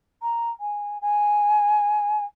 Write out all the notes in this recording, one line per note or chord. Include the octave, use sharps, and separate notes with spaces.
A#5
G#5
G#5